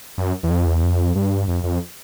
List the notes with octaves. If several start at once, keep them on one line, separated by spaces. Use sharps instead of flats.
F#2
E2
F2
E2
F2
G2
F2
F2